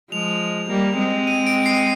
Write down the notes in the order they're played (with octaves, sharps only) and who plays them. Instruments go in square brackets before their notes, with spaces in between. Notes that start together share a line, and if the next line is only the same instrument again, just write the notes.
[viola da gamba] F3 G#3 [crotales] F7
[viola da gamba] G3 A#3
G#3 C4
[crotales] D#7
D7
C7